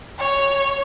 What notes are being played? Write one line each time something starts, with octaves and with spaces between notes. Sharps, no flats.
C#5